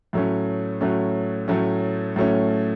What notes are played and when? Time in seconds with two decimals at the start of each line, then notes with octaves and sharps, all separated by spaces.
0.13 A2 F#3 A3 C#4
0.81 A2 F#3 A3 C#4
1.48 A2 F#3 A3 C#4
2.16 A2 F#3 A3 C#4